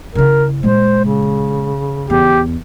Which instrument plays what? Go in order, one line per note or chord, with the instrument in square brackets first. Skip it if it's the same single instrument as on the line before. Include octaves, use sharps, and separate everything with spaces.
[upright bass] C#3 E4 [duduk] A#4
[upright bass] A#2 G#3 [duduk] C5
[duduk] C#3
[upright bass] E2 [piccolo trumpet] G4